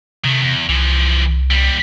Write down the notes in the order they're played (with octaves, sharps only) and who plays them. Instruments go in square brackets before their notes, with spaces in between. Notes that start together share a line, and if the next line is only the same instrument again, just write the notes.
[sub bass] C3 [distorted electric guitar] D#3 A3
[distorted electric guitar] E2
[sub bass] C2 [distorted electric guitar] E3 F3
[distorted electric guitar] D#2 G3